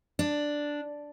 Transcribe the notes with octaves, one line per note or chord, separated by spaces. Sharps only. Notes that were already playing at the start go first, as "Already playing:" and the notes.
D4